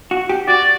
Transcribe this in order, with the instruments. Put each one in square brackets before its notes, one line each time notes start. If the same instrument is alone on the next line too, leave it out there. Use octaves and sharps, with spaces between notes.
[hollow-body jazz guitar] F#4
G4
[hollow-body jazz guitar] F#4 [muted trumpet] D5